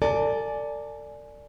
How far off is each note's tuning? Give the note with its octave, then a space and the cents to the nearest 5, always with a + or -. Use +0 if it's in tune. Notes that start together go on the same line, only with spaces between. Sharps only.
A4 +45 D5 +0 G#5 +15